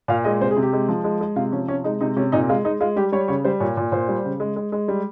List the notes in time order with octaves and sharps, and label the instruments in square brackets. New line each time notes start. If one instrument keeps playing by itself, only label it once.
[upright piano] A#2 F5
G#3 D#5
C3 C5
G#4
C3
G4
G#3
F3
G#3
G#3
C3 F4
F3 C#4
C3 C#4
G#3 D#4
C3 D#4
C3 C#4
A#2 D#4
G#3 F4
G#3 D#4
G#3 F4
G3 G4
G3 C#5
C#3 C#5
G3 C5
A#2 C#5
A#2
A#2 C5
G3
C#3
G#3
G#3
G#3
G3